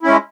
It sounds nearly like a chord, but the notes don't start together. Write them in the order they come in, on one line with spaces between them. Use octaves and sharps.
E4 C#4 G#3